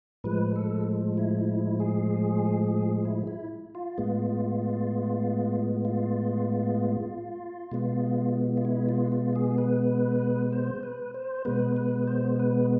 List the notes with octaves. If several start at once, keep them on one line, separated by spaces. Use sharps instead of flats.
A2 F3 G#3 B4
A4
E4
E4
G#4
E4
E4
F4
A2 G#3 B3
F4
B2 G#3 B3
F4
E4
F4
F4
G#4
B4
C5
B4
C5
B2 G#3 B3 B4
B4
C5
B4